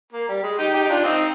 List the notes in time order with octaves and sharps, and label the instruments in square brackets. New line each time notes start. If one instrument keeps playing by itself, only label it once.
[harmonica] A#3
G3
G#3
D#4 G4
D#4 G4
D#4
D4 F4
C4 D#4